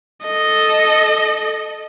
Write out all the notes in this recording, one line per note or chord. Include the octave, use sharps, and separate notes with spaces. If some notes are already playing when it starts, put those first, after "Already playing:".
A4 D#5